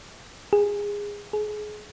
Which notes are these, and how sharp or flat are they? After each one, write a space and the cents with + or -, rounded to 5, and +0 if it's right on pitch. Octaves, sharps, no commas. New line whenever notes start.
G#4 -20
G#4 +25